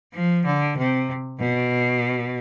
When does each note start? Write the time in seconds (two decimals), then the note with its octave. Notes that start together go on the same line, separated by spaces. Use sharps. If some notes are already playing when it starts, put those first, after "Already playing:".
0.14 F3
0.45 D3
0.78 C3
1.40 B2